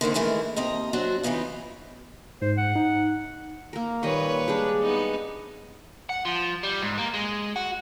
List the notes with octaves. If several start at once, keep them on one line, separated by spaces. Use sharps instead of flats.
D3 D#3 A#3 C4
D#3 E3 G#3 A3 A#4
D#2 C4 D#5 A#5
F#3 C4 D4 F#4
C#3 E3 B3 D#4 F4
G#2 C5
F#5
D#4
A#3 A#4
A#2 D#3 G3 B4 C#5 D#5
G3 G#3 D4 G#4
B3 D#4
F#5
F3
G3
G#2
A#3
G#3
F#4